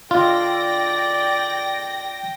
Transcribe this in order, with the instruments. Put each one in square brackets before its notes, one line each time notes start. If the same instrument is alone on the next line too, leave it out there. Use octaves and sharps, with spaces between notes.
[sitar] D3 G#3 [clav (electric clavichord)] F4 [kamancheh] D5 [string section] G5 A#6